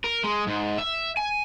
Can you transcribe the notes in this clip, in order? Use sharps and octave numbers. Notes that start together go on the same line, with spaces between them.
A#4
G#3
G#2
E5
G#5